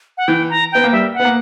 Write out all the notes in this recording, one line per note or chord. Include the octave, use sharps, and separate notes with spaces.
F#5
E3 G5
A#5
B3 G5
A#3
G3 E5
F#5
B3
A#3